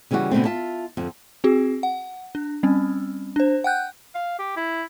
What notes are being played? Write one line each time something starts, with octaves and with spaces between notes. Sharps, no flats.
C#3 E3 G3 C#4 F#4
B2 D3 A3 C4
F4 E5 A5
F2 D3
C4 F#4 G#4
F#5
D4
G3 C4 C#4
D4 C5
F#5 G5 F#6 G6
F5
G4
E4